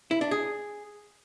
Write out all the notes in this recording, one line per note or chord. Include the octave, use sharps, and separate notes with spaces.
E4
D4
G#4